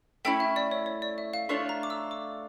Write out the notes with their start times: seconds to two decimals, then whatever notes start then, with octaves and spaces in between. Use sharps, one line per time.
0.25 A3 C#4 E4 G5
0.40 E5
0.56 D5
0.71 C#5
0.86 C#5
1.02 D5
1.18 E5
1.34 F5
1.49 A3 D4 F4 C#5 C#6
1.69 A#5
1.83 D6
1.90 E6
2.11 D6